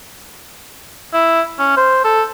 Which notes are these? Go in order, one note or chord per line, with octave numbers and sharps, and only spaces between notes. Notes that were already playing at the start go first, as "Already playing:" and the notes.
E4
C#4
C5
A4